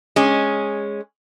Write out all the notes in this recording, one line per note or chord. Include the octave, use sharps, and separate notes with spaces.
G#3 C#4